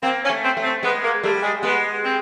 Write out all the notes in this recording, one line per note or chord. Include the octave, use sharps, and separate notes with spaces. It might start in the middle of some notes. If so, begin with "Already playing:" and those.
A#3 C4
C#4
A3
C4
A3
C4
G#3 B3
A#3
G3 A3
G#3
G#3 B3
C4